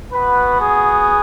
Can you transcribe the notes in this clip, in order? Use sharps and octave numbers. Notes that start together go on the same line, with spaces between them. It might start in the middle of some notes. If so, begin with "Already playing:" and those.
B3 F#4 B4
G#4